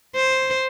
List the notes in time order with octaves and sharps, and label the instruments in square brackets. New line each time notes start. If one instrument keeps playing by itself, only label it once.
[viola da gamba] C5